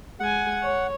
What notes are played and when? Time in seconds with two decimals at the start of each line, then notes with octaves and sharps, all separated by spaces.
0.20 G#3 F#5 G#5
0.63 C#5